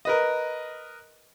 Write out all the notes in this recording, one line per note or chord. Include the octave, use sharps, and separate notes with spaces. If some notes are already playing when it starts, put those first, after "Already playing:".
A#4 B4 D#5